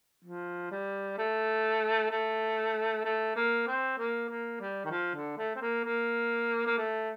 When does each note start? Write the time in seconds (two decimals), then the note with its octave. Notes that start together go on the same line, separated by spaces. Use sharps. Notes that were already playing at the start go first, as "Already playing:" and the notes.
0.24 F3
0.71 G3
1.18 A3
2.11 A3
3.05 A3
3.36 A#3
3.67 C4
3.98 A#3
4.29 A#3
4.60 G3
4.85 D#3
4.91 F3
5.15 D3
5.38 A3
5.56 C4
5.61 A#3
5.84 A#3
6.67 A#3
6.78 A3